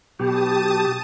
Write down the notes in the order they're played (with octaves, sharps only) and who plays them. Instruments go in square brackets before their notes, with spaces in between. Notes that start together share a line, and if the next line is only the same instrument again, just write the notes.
[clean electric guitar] B1 B2 [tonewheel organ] G4 [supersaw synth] A5 D#6